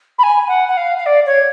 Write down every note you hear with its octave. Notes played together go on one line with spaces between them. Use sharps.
B5
G#5
F#5
F#5
F5
F5
D5
C#5